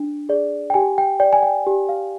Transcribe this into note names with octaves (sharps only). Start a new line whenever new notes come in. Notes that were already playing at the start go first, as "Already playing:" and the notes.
Already playing: D4
G#4 D5
G5
G4 G#5
G5
D5 G5
G#5
G5
G4
F5